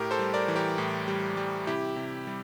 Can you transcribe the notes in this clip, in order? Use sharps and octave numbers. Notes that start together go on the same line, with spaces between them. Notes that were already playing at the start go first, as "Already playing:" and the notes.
Already playing: A2 G4 A#4
A4 C5
G3
A#4 D5
E3
G4 A#4
A2
G3
G3
C3 E4 G4
C3
G3